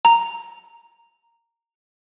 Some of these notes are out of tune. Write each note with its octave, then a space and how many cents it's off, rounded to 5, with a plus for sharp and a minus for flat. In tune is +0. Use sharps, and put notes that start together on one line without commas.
A#5 -10